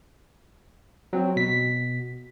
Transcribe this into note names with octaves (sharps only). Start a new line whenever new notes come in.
F#3 C4
B2 B6